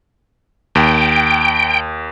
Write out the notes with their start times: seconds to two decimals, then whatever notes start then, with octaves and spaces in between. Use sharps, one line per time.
0.75 D#2 G5